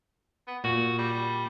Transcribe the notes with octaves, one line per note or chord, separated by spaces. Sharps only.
B3
A#2 F#4
G3